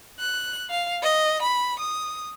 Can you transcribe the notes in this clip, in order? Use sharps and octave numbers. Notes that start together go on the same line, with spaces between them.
F#6
F5
D#5
B5
D#6